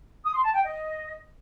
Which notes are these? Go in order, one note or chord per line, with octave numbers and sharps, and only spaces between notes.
D#6
C6
A5
G5
D#5